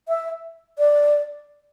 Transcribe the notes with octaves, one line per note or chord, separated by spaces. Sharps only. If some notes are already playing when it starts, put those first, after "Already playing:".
E5
D5